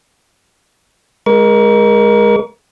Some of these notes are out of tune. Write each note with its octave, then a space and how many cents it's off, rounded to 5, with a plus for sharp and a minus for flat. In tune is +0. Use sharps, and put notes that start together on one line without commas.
G#3 +0 A#4 +25 C#6 +45